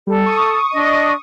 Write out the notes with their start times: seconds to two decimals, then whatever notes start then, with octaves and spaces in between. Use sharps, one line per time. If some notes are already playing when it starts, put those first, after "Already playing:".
0.07 G3 A4
0.26 C#6 D#6
0.73 D4 D#5